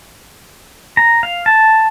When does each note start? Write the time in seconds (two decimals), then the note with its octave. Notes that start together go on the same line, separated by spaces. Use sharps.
0.97 A#5
1.23 F5
1.46 A5